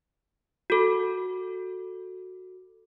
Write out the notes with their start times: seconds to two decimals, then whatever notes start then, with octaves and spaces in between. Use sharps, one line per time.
0.70 F#4 A4